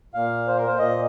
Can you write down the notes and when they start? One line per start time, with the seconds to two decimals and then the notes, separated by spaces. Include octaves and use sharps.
0.14 A#2 A#3 F5
0.47 C5
0.57 A#4
0.67 C5
0.79 A#2 A#3 D#5